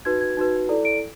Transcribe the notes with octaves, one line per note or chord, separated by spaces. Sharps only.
D#4 F#4 B4 G#6
G#6
D#4 F#4 B4
E4 A4 D5
D7